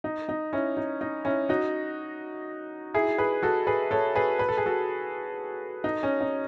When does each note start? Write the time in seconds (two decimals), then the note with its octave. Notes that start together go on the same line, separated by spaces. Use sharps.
0.04 D#4
0.29 D#4
0.53 C#4 E4
0.77 D#4
1.01 D#4
1.25 C#4 E4
1.49 D#4 F#4
2.94 E4 G#4
3.18 G#4 B4
3.43 F#4 A4
3.67 G#4 B4
3.91 A4 C#5
4.15 G#4 B4
4.39 B4
4.49 A4
4.57 G#4
4.66 F#4 A4
5.84 D#4
6.03 C#4
6.21 D#4